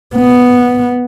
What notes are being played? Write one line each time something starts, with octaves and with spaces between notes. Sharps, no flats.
B3